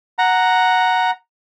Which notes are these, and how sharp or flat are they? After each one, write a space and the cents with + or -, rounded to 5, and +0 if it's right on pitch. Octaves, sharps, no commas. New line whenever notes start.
F#5 +0 A#5 +0